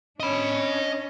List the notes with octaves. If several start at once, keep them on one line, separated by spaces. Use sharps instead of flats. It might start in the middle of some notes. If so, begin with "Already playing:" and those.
C#4 D4 D#5 B5